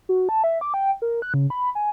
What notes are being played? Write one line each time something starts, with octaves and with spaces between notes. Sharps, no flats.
F#4
A5
E5
D6
G5
A#4
F#6
C#3
B5
G#5